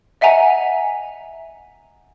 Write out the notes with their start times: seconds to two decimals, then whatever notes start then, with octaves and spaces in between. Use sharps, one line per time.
0.21 D#5 E5 F#5 G#5 A#5